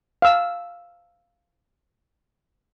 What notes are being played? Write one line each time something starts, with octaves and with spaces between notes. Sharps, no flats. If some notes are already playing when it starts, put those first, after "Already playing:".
F5 E6